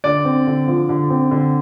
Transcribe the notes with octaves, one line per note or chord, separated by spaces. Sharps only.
D3 D5
C4
D3
F3
D3
C4
D3